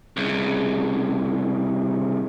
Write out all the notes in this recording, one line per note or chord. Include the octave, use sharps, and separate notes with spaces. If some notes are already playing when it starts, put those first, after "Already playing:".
C2 C#3